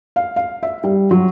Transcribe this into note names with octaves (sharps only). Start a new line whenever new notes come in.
F5
F5
E5
G3
F#3